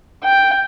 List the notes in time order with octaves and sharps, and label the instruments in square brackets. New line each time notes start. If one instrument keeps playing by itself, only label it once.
[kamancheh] G5